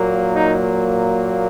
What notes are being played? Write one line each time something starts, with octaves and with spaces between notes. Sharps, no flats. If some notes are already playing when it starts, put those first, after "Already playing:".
Already playing: A#2 F#3 A#3
D#4